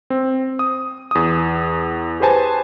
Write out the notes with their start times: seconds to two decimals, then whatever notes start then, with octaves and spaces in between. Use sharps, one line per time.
0.10 C4
0.59 D#6
1.11 E2 D#6
2.20 G4 G#4 B4 C5 G#5 A5